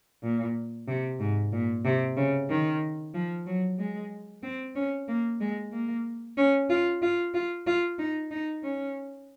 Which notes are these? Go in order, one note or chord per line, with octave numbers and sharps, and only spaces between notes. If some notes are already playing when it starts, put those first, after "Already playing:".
A#2
C3
G#2
A#2
C3
C#3
D#3
F3
F#3
G#3
C4
C#4
A#3
G#3
A#3
C#4
F4
F4
F4
F4
D#4
D#4
C#4